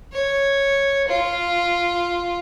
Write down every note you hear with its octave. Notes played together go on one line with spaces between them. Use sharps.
C#5
F4